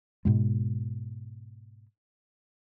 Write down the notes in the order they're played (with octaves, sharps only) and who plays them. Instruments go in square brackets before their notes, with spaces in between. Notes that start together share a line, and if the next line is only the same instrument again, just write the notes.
[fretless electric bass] G#2 B2 G#3